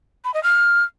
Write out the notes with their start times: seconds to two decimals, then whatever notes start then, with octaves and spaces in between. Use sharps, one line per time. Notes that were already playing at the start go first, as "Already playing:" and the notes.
0.25 B5
0.34 D#5
0.43 F6